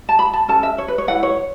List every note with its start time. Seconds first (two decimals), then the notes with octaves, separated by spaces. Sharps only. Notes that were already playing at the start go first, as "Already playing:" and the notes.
0.09 A5
0.19 B5
0.33 A5
0.48 C#4 A4 A5
0.63 E5
0.78 C#5
0.88 B4
0.98 C#5
1.08 E4 B4 F#5
1.23 C#5